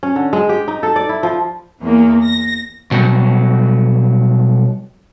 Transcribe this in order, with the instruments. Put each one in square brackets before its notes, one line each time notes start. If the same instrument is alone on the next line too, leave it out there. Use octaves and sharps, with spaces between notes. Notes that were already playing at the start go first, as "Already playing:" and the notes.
[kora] C#4
D3
G#3
G4
D#4
A4
D5
E4
F3
[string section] E2 A#3
A#6
[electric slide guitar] B2 F#3 G3